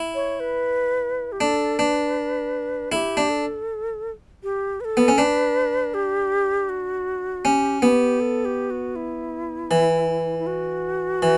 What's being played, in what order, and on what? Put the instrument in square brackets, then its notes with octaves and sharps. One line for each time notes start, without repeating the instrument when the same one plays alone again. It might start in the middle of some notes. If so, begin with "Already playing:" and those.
Already playing: [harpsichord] E4
[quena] C#5
B4
G4
[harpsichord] D4 [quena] A4
[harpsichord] D4 [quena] B4
[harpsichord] E4 [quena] A4
[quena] G4
[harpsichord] D4
[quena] A4
G4
B4
A4
[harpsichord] B3
C#4
[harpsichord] D4 [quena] B4
[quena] G4
F#4
[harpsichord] C#4 [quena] G4
[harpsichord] B3 [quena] G4
[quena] A4
G4
F#4
E4
[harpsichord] E3
[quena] E4
F#4
[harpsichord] E3